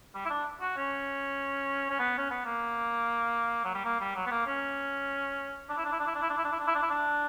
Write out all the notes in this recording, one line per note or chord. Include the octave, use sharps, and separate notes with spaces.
G3
E4
D4
F#4
C#4
C#4
B3
C#4
B3
A#3
F#3
G3
A#3
G3
F#3
B3
A#3
C#4
D4
E4
D4
E4
D4
E4
D4
E4
D4
E4
D4
E4
D4
E4
D4
E4
D4